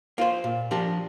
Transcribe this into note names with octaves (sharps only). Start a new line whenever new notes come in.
A#3 F4 C5
A#2
F3 D4 G4 A#4